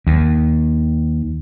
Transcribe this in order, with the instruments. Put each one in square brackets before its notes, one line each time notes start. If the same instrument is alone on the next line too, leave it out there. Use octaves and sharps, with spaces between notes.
[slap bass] D#2